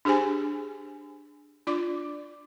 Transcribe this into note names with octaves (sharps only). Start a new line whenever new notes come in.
D4 G4 G#4 C5 G#5
D4 F4 D5 D6